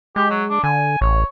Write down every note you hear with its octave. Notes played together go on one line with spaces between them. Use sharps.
G#3 G4
F#3
D4
D3 G#5
A1 C#5